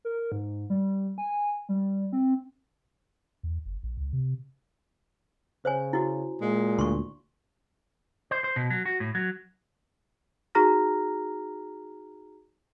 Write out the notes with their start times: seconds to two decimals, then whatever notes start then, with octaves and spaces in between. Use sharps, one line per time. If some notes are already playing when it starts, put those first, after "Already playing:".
0.05 A#4
0.32 G#2
0.70 G3
1.18 G#5
1.69 G3
2.12 C4
3.43 E2
3.66 F#1
3.83 A#1
3.97 C#2
4.13 C3
5.65 C#3 C5 C#5 G#5
5.93 E4 F#4
6.41 A#2 G#3
6.79 D2 C6 C#6
8.31 C5
8.44 C5
8.56 B2
8.70 F#3
8.85 F#4
9.00 A2
9.15 F#3
10.55 D#4 F#4 G#4 A#5 F6 A#6